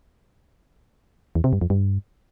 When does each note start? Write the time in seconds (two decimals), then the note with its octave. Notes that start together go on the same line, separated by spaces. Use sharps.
1.35 E2
1.44 C3
1.53 G2
1.61 F2
1.70 G2